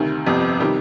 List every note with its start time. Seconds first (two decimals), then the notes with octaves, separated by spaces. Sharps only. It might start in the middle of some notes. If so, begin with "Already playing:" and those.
Already playing: D2 C3 D#3
0.26 G1 F2 C3
0.60 C3 D#3 G3 G4